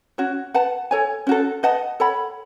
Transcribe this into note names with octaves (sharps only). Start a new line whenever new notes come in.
C#4 F#4 C#5
B4 F#5 A5
A4 C#5 G#5
C#4 F#4 A4
B4 D#5 F#5 A5
A4 C#5 F#5 B5